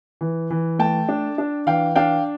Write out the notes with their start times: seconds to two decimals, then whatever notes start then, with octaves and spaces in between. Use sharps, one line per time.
0.21 E3
0.51 E3
0.79 A3 G5 A5
1.09 D4
1.38 D4
1.66 E3 F5 G5
1.96 D4 F5 G5